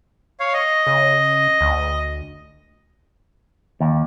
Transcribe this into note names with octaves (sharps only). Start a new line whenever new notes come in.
C#5 F5
D#5
C#3
D2
D#2